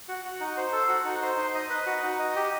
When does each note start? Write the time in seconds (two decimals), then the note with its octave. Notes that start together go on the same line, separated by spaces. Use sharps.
0.08 F#4
0.25 F#4
0.40 D#4
0.57 C5
0.73 A4
0.89 F#4
1.05 D#4
1.22 C5
1.38 D#4
1.55 D#5
1.70 B4
1.86 F#4
2.03 D#4
2.19 D#5
2.36 G4